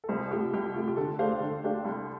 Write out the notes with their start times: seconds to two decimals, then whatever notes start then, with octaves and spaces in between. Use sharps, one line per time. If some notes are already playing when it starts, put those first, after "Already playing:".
0.04 A4
0.09 C2 C5
0.31 C3 A3 F4 G4
0.53 C2 G4
0.75 C3 A3 F4
0.88 G4
0.97 D3 A4
1.19 A3 D4 G4 C5 F5
1.41 D3
1.64 A3 D4 G4 F5
1.85 C2